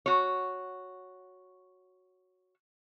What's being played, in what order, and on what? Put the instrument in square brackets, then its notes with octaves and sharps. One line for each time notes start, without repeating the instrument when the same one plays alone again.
[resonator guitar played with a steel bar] F#4 C#5